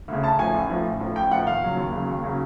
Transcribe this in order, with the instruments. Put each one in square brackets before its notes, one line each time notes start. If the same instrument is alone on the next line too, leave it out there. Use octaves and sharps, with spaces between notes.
[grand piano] D2 C#3
A1 A5
A2 F3 G#5
A1
A2 F3
A1
A2 F3
A1 G5
A2 F3 F#5
D#2 F5
C#3 F#3
D#2
C#3 F#3
D#2
C#3 F#3